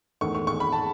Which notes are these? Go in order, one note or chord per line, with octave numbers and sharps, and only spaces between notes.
E2 D#3 A3 C#6
C#6
C#6
B5
A5